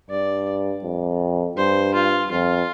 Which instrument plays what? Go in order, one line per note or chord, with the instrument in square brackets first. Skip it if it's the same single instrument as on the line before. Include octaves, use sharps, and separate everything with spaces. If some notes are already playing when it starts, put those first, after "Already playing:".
[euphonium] G2 [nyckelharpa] D5
[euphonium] F2
[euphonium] G2 [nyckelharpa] C5
[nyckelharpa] F4
[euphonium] F2 [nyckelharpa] F4